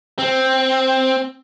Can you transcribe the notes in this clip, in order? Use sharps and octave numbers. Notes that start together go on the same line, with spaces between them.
C4